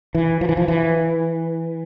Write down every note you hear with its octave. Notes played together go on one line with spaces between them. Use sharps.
E3
F3
E3
F3
E3